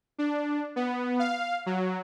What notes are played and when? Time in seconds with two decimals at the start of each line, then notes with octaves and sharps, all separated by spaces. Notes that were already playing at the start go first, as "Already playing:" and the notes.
0.18 D4
0.76 B3
1.19 F5
1.66 F#3